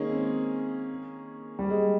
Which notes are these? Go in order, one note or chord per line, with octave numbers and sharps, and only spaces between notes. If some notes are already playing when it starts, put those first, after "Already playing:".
Already playing: D#3 G#3 A#3 C#4 G#4
C4
G3
G#3